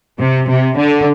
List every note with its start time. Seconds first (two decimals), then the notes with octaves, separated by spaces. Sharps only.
0.20 C3
0.49 C3
0.77 D3